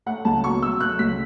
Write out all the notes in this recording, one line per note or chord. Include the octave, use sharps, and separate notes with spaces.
A3 F#5
C#2 A5
B2 C#6
F#3 E6
A3 F#6
C#2 B6